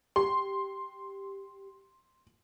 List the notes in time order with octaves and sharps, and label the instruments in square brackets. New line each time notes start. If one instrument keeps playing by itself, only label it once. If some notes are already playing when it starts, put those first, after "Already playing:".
[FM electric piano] G4 [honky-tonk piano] C6